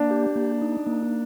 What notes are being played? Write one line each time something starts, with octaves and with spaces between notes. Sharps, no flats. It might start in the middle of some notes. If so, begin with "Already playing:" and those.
Already playing: A#3 D4
G4
A#3
D#4
A#3